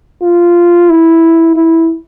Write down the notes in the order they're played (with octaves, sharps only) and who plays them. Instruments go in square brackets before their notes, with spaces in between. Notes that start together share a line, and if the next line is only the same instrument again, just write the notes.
[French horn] F4
E4
E4